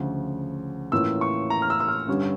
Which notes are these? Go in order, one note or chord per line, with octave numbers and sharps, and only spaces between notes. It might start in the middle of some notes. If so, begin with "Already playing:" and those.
Already playing: D2 C#3 F3
A2 E3 A#3 C#4 F4 E6
C#6
A#5
F6
E6
E6
F6
G2 D3 G3 C#4